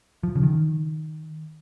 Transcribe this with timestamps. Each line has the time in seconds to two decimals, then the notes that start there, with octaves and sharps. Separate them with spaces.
0.23 F3
0.35 C#3
0.43 D#3